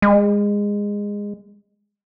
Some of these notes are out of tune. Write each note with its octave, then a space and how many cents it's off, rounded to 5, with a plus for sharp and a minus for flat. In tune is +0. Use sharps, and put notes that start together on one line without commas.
G#3 -20